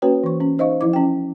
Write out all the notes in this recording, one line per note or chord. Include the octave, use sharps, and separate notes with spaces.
A#3 C#4 F#4 B4 C#5 G5
E3 C#6
C#4
D#4 C5 D#5 F5 C#6
F3 E4 D6
C#4 G5